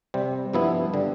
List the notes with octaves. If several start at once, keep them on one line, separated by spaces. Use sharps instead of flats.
C3 G3 C4
G2 F3 B3 E4
D3 G3